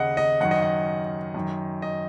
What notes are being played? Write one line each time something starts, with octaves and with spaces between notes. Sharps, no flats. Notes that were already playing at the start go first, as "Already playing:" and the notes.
Already playing: D#2 C#3 D#5 F#5
D#5
F#2 D#3 F#5
D#5
F#5
F#2 D#3
D#5